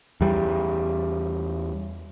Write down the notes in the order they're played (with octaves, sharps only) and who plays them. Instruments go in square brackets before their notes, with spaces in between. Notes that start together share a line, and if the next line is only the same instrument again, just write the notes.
[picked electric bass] E2 G3